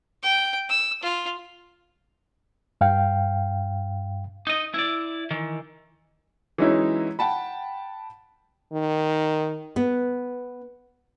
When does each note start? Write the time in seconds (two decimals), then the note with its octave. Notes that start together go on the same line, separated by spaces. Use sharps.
0.23 G5
0.69 E6
1.03 F4
2.81 G2 F5 G5
4.47 D#4 D#5
4.74 E4 D5
5.31 D#3 E3
6.58 E3 F#3 G#3 C#4 D#4 E4
7.19 F#5 G5 A5 B5
8.73 D#3
9.76 B3 B4